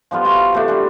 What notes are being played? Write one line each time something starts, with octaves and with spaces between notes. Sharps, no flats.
F3 G3 B3 F4
F4 F#4 B4
C3 A3 D4
G3 D4